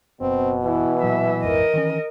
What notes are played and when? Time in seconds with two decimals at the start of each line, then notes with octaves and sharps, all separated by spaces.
0.21 F#1 B2 C4
0.64 E3 E4
1.03 A#2 F#3 E5
1.43 A#1 F2 G#2 A#4 D#5
1.74 D#3 E3 C#4